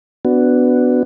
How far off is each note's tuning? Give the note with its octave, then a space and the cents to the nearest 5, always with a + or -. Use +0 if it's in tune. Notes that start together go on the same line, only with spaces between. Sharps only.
B3 +15 D4 +0 F#4 +0